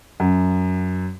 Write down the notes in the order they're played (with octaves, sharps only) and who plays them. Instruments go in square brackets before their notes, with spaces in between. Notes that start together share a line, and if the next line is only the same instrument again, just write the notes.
[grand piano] F#2